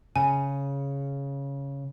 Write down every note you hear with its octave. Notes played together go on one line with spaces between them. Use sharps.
C#3 G#5